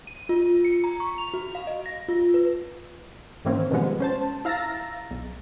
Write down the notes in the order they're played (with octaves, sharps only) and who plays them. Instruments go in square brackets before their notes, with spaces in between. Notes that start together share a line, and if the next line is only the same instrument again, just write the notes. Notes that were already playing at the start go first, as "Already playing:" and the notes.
[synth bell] D#7
F4
C#7
A#5
C#6
F7
F#4
F5
D#5
A#6
F4
B4
[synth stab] G#2 D#3 E3 A#3 C4 C#4
B2 D#3 F3 G3 G#3 B3
C#4 C5 A5
E4 F5 A#5 E6 A6 A#6
B1